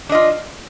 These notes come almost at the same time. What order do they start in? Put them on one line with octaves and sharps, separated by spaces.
D4 D#5 F4